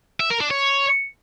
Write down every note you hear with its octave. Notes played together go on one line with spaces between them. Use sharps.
E5
A#4
D4
C#5